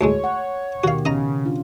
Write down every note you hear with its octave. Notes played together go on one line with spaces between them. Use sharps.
D2 A2 G#3 C#5
F#5
B2 D#3 F#4 G4 F5
C#3 C#4 D#5 A#5
D4 F4